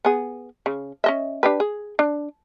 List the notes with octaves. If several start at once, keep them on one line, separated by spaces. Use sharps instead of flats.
B3 G#4
C#3
C#4 D#5 E5
D4 G4 B4
G#4
D4